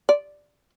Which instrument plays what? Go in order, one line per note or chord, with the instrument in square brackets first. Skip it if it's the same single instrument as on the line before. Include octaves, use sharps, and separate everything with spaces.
[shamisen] D5